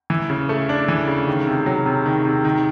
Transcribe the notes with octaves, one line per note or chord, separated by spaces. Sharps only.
E3
C#3
A3
D4
E3
C#3
D#3
C3
F#3
C3
D#3
C3
D#3